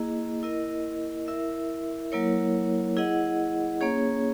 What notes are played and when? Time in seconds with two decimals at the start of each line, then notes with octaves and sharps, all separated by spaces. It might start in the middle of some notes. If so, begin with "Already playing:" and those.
Already playing: A#3 E4 G#4 D#5
0.43 E4 A#4 D#5
1.28 E4 A#4 E5
2.12 F#3 A#3 E4 A#4 C#5
2.96 E4 G#4 D#5 F#5
3.81 A#3 C#4 G#4 C#5